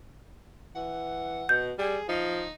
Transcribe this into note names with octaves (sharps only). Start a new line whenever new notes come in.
E3 F#5
B2 G6
G3 G#4
F3 D#4